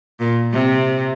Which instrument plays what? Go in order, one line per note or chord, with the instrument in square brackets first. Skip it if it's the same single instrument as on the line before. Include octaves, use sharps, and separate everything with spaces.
[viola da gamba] A#2
C3